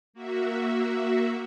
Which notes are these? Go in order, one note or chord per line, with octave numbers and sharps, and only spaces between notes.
A#3 F#4 E5